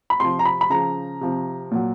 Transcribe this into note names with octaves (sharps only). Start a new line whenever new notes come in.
B5
C3 F3 C6
A#5
B5
B5
C#3 F3 A#5
C3 F3
A#2 F#3